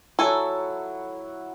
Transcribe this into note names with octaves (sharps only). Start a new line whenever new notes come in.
F#3 E4 F#4 A4 G#5